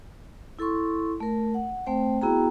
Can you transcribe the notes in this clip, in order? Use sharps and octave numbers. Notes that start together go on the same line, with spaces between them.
E4 A4 C6 C#6
A3 A#4
F#5
A3 C4 C5 G5
B3 E4 F#4 G#4 G5 A#5